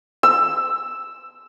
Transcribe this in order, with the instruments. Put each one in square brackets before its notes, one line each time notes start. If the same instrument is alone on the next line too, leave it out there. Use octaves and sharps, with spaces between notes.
[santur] E6